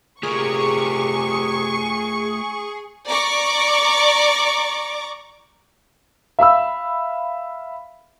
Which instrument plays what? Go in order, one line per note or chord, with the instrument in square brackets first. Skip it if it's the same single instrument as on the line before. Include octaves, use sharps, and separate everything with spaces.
[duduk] C3 [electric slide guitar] A3 F4 A#4 [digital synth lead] G#4 [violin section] C#6
[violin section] D5 A#5 C#6 D6
[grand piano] E5 F5 B5 E6